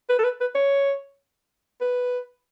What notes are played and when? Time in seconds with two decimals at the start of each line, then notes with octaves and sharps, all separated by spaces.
0.09 B4
0.19 A4
0.24 B4
0.41 B4
0.55 C#5
1.81 B4